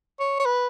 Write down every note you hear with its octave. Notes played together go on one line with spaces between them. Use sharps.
C#5
C#5
B4